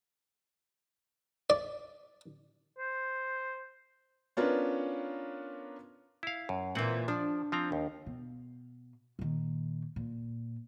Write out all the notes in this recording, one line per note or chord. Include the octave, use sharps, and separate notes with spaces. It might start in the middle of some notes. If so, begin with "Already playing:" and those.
D5
C5
B3 C#4 D4 F4 A#4 B4
E4 F5
F#2
A#2 E3 C4 F#5
F3 D4
F3 C4 A#5
D#2
B2
A#2 D#3
A#2